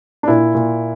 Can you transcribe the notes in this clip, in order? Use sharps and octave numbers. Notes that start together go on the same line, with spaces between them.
D4
A#2 E4
A#2